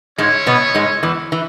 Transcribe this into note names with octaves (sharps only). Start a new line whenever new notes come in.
G#2 G#3 C#4 E4 C#5
B2 B3
G#2 G#3
E2 E3
E3